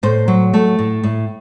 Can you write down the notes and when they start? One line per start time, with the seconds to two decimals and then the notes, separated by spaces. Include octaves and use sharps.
0.03 A2 C5
0.28 F#3
0.54 A3
0.79 A2
1.03 A2